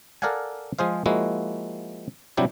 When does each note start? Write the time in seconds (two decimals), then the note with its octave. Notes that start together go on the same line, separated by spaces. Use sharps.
0.22 A4 A#4 D5 F5 F#5 G#5
0.79 F3 G#3 G#4 C5 F5
1.06 F3 G#3 A#3 E4 F#4
2.37 C3 F#3 G3 D4 E4 G4